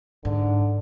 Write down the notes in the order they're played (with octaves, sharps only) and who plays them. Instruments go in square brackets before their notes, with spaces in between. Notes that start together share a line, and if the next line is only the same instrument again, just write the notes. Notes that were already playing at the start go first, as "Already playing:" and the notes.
[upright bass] G#2 [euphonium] D3